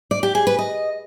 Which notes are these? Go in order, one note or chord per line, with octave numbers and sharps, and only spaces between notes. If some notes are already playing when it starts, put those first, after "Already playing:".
D5
G4
G#4
B4
D#5